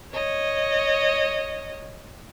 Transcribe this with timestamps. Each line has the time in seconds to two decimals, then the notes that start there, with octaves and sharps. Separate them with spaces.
0.13 C#5 D#5